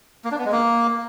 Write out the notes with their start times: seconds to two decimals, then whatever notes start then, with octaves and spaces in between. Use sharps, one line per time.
0.25 A#3
0.32 D4
0.38 B3
0.45 G#3
0.52 A#3